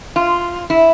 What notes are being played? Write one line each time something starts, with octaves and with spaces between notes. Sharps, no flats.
F4
E4